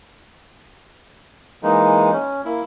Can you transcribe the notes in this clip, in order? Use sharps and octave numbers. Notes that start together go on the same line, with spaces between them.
E3 G#3 A#3 D#4
C#4
A#3 E4